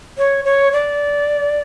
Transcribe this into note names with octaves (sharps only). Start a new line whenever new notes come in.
C#5
C#5
D5